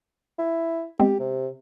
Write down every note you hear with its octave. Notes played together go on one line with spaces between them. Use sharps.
E4
G#3 B3 C4 G4
C3